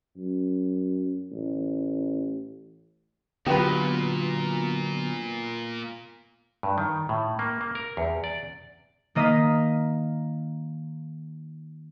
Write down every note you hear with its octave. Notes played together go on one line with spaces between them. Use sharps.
F#2
A1
A#2 D3 F#3 B3 F4 G4 B4
G2
D#3
A2
A#3
A#3
A#4
E2
D5
D#3 A#3 D#5 F5 D#6 B6